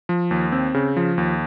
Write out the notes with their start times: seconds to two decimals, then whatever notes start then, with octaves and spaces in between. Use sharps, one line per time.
0.09 F3
0.31 D#2
0.52 C4
0.74 C#3
0.97 F3
1.18 D#2